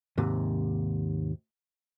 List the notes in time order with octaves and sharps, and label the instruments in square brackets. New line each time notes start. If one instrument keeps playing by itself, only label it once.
[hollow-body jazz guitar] D#2 G#2 C3